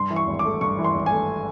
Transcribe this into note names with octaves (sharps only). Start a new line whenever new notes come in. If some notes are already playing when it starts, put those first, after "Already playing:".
Already playing: G2 C6
E3
C#6
G#1
D6
A3
G2 C#6
E3
C6
G#1
G#5
A3